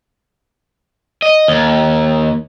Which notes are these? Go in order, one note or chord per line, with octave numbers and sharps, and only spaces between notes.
D#5
D#2